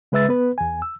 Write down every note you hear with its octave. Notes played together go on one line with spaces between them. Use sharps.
C#3 G#3 B4 E5 E6 A6
B3 B4
E2 G#5
E6